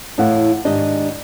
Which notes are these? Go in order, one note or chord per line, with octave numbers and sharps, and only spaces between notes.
E2 A2 E4 F5 F#5
G#2 D#3 D4 G4 D#5